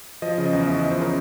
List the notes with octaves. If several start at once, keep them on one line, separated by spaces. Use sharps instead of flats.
F3 D#5
C#3
D#5
E2
E2 E5
D#5
F3
C5
C#3 A#4